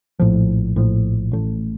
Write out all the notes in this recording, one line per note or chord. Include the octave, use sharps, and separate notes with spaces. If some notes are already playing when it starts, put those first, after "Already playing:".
A#1 A2 F3
A#1 A2 F3
A1 A2 A3